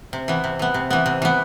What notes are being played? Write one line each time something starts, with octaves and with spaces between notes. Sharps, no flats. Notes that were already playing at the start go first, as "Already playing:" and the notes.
C3
E3 B3
C3
E3 B3
C3
E3 B3
C3
E3 B3